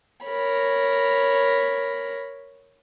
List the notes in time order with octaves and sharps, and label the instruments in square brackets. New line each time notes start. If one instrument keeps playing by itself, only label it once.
[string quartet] A#4 C#5 B5